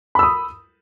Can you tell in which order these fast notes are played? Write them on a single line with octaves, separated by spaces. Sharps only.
B5 E6 D#6